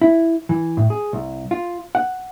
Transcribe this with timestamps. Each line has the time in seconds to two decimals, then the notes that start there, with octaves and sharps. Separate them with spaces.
0.02 E4
0.49 E3
0.77 A2
0.90 G#4
1.13 C2
1.51 F4
1.95 F#5